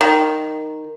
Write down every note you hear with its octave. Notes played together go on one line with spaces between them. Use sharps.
D#3